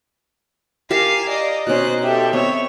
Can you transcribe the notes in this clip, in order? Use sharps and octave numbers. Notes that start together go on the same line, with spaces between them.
G4 A#4 F5 G#5 A5
D5 D#5
B2 C#4 D#4 C5 F#6
G4 A4 E5
B3 C4 C#5